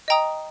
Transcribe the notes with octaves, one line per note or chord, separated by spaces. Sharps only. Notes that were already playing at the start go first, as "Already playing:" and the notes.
D#5 G5 A#5 D#6